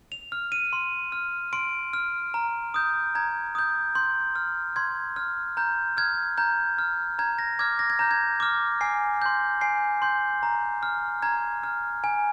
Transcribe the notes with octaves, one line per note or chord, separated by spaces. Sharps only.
F7
F6
D#7
C6
F6
C6 D7
F6
A#5
D#6 G6
A#5 G#6
D#6 G6
C6 G6
F6
C6 G#6
F6
A#5 G6
F6 G#6
A#5 G6
F6
A#5 G#6
A#6
D6 F6 G#6
A#6
G#6
A#5 G6
G#6
D6 F6
G#5 C7
C6 G6
G#5 C7
C6 G6
A#5
F6
A#5 G#6
F6
G#5